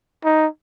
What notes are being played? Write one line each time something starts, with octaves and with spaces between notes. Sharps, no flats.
D#4